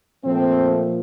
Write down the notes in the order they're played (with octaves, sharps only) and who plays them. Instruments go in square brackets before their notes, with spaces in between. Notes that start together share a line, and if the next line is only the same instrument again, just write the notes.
[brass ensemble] A#2 F3 A3 C4